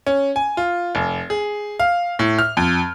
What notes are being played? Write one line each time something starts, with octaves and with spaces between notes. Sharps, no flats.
C#4
G#5
F4
F1
G#4
F5
A2
F6
F2